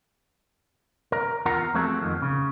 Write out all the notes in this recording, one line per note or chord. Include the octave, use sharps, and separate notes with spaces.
A#4
E2 F4 A#4 F#5 A#5
F3 A3 C4 F#4 G#4 A4
F2 D#3 F3
C#3